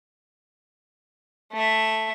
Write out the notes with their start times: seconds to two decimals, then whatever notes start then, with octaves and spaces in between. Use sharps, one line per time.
1.53 A3 E5